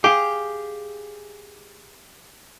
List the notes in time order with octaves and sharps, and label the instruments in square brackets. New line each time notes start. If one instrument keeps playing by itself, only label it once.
[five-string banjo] G4 [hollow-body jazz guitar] G#4 F5